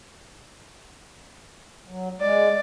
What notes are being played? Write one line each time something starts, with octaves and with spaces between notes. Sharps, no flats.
F#3
G#3 D5